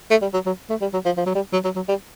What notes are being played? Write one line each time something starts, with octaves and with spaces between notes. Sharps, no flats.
A3
G3
F#3
F#3
A3
G3
F#3
F3
F3
F#3
G3
F#3
F#3
F#3
G3